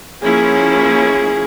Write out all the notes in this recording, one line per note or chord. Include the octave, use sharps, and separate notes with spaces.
F3 A#3 C#4 E4 G#4